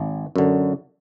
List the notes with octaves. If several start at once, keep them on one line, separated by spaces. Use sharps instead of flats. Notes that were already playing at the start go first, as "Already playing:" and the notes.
Already playing: G#1
F#2 D3